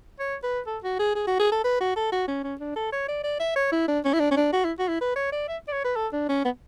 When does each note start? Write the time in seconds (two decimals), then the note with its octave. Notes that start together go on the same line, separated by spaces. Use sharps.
0.19 C#5
0.43 B4
0.67 A4
0.83 F#4
0.99 G#4
1.15 G#4
1.27 F#4
1.40 G#4
1.52 A4
1.64 B4
1.80 F#4
1.96 A4
2.12 F#4
2.28 C#4
2.44 C#4
2.60 D4
2.76 A4
2.92 C#5
3.08 D5
3.24 D5
3.40 E5
3.56 C#5
3.72 E4
3.88 D4
4.05 C#4
4.14 E4
4.20 D4
4.31 C#4
4.37 D4
4.53 F#4
4.65 E4
4.79 F#4
4.88 E4
5.01 B4
5.16 C#5
5.32 D5
5.49 E5
5.68 D5
5.72 C#5
5.85 B4
5.96 A4
6.13 D4
6.29 C#4
6.45 B3